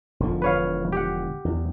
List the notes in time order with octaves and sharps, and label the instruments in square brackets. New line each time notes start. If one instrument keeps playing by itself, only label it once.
[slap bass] E1 D3 F3
[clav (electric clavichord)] B4 C#5 F5
G4 F#5
[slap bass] E2